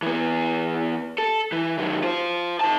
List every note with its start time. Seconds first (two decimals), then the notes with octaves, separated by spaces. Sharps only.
0.02 E3 B3
1.18 A4
1.52 E3
1.78 D#3 F#3
2.04 F4 C5
2.61 D#3 A5